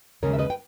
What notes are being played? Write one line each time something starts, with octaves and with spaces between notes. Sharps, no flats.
D#2 C#3 G#3 A#4 C#5
E5
B4 D#5
G5